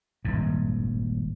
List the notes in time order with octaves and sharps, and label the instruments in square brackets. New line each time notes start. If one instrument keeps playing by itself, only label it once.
[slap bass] D#1 G#1 G2